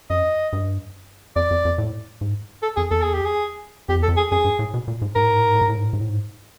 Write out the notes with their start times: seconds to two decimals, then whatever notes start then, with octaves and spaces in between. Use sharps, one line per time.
0.10 F#2 D#5
0.53 G2
1.36 F2 D5
1.51 F2
1.65 F2
1.78 A2
2.21 G#2
2.63 A4
2.77 F2 G#4
2.91 E2 A4
3.02 G#4
3.14 G4
3.25 G#4
3.89 F2 G4
3.99 E2 A4
4.08 F2
4.17 G#4
4.31 F#2 G#4
4.45 G2
4.59 A2
4.74 B2
4.88 A#2
5.02 G#2
5.15 G#2 A#4
5.22 A2
5.31 G#2
5.39 A2
5.47 G#2
5.55 A2
5.62 G#2
5.69 A2
5.77 G#2
5.86 A2
5.93 G#2
6.01 A2
6.09 G#2